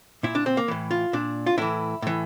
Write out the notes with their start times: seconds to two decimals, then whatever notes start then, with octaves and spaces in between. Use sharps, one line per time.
0.23 A#2 E4
0.35 D4
0.46 C4
0.57 A#3
0.68 A2 E3
0.91 F4
1.13 A#2 D4
1.46 F4
1.58 A2 E3 E4
2.02 A2 E3